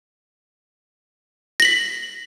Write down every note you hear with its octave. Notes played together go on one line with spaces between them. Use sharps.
A#6 B6 F#7